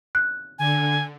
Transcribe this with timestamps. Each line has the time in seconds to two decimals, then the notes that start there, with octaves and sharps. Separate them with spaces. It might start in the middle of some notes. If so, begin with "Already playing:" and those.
0.15 F#6
0.59 D3 G#5